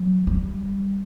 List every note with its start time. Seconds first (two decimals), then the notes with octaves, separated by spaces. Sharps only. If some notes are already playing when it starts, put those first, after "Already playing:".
Already playing: F#3
0.27 G3